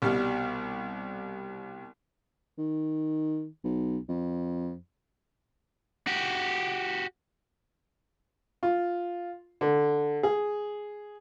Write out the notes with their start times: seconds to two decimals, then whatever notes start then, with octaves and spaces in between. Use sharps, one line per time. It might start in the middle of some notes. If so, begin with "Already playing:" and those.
0.02 C2 B2 G3 F6
2.58 D#3
3.64 B1
4.09 F2
6.07 F#4 G4
8.63 F4
9.61 D3
10.23 G#4